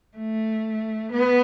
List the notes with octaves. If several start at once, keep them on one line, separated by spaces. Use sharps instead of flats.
A3
B3